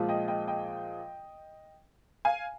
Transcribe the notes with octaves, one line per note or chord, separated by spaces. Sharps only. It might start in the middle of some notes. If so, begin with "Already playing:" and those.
Already playing: A#2 F3 G#3
D#5 G5
D#5 G5
D#5 G5
F5 G#5